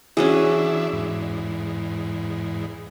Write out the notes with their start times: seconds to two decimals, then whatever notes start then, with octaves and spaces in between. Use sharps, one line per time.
0.17 E3 C#4 D4 F#4 G#4 E5
0.92 E2 G#2